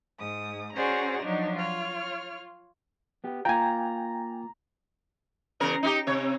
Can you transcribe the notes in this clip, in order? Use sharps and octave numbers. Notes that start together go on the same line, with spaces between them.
G#2 D#6
C#4 F#4 G#4 C5 D5 A#5
F3 F#3 D4 D#4
F4 C#5 F6
B3 G4
A#3 F4 G5 G#5 A#5
E2 C#3 A#4
D#4 E4 G4
C3 C#5